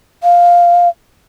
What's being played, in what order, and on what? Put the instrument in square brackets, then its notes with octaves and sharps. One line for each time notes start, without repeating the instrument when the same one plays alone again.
[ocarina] F5